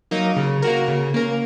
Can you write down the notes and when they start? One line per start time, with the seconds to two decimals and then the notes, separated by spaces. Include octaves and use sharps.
0.11 F#3 A#3 D#4
0.36 C#3
0.62 A#3 F#4 A#4
0.88 C#3
1.14 A#3 C#4 A#4